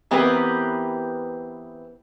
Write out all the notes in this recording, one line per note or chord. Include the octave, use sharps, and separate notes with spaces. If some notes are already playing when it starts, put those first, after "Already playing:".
E3 B3 C4 G4 A#4 B4